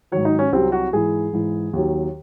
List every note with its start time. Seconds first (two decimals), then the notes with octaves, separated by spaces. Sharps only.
0.12 G#2 D#3 F#3 C#5
0.25 D#4
0.39 C#4
0.52 C2 C3 F#3 C4
0.72 F#4
0.92 G#2 E3 G#4
1.33 G#2 E3
1.73 D#2 D#3 F#3